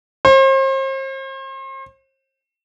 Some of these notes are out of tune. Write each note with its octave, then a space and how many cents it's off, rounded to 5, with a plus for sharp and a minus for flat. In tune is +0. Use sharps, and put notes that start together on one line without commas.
C5 +40